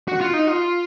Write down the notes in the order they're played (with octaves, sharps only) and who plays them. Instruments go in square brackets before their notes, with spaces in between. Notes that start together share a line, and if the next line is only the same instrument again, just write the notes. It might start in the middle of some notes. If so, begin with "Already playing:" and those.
[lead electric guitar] F#4
F4
D#4
F4